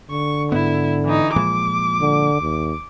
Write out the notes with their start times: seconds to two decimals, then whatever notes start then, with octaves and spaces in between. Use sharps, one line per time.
0.11 D3 C#6
0.52 G#2 B3 E4
1.05 E3 D#4
1.36 A#2 F3 G#3 D6
2.00 D3
2.41 D#2